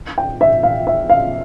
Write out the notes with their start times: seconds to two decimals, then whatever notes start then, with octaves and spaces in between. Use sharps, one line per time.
0.18 G5
0.41 E5
0.63 F5
0.87 E5
1.10 F5